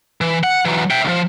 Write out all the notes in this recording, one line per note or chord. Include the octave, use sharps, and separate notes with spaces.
E3
F#5
E3 F#3
E5 G5
D2 F3